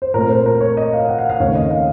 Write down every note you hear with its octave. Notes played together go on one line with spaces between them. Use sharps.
C5
A#2 A3 C4 A#4
C5
A#4
C#5
D#5
F5
F#5
F5
F5
D#2 C#3 A3 C4 C#5
D#5
F5